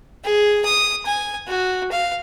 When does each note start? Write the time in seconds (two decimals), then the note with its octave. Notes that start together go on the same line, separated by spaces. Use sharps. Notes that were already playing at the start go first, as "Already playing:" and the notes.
0.24 G#4
0.65 D#6
1.06 G#5
1.47 F#4
1.92 F5